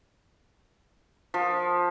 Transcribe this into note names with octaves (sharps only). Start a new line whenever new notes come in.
F3